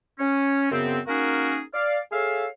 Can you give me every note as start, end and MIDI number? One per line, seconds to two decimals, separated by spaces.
0.19 0.70 61
0.71 0.99 42
0.71 0.99 49
0.71 0.99 59
0.71 0.99 60
1.07 1.61 58
1.07 1.61 61
1.07 1.61 63
1.07 1.61 66
1.07 1.61 68
1.07 1.61 70
1.74 1.98 74
1.74 1.98 77
2.12 2.47 68
2.12 2.47 69
2.12 2.47 73
2.12 2.47 76
2.12 2.47 77